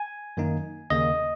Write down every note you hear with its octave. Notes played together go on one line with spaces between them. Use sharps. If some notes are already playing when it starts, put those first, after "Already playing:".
Already playing: G#5
F#2 D#3 A#3 D#4
D#2 C#3 A#3 D#5